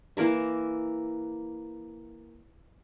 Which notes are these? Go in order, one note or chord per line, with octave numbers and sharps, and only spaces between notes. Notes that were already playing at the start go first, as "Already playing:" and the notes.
E3 A#3 A#4 E5